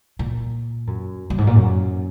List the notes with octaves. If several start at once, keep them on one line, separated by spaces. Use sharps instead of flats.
A#2
F#2
F#2
G#2
A#2
F#2